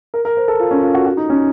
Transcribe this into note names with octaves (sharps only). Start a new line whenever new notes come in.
A#4
A#4
C5
A4
F4
C#4
F4
F#4
F#4
D#4
C#4